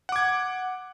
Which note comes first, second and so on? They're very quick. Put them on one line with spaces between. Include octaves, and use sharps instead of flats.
F#5 D6 G#6